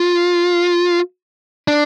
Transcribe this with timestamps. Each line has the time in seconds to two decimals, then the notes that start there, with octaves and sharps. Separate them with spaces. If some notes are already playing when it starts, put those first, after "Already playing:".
Already playing: F4
1.68 D4